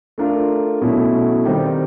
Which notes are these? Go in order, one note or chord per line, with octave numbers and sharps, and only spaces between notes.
A3 D4 F4 A#4
B2 F#3 A3 C#4 E4
D#3 G3 C4 D#4 G4